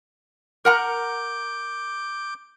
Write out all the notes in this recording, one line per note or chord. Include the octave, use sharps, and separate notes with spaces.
A#4 F#5 A#5 D6 G6